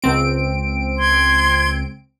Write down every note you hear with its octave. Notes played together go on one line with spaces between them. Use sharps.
C#2 C4 D7
C6 G#6